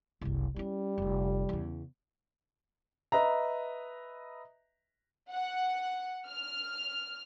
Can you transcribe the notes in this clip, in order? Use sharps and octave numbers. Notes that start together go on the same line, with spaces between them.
F#1 C2
G3 C#4 E4
F1 D3
E2 C#3
B4 D#5 E5 A#5
F#5
F6